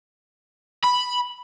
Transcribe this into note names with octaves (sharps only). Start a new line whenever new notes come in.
B5